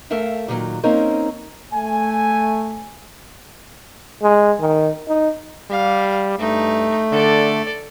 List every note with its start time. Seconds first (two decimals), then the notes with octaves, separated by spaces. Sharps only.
0.10 A3 A4 A#4 E5 F5 G5
0.48 A#2 D#3 F3 F#3
0.83 A#3 C4 C#4 D#4 A#4
1.73 A3 G#5
4.23 G#3
4.61 D#3
5.08 D#4
5.70 G3 F5
6.39 G2 A3 D#4
7.12 D3 A4 D5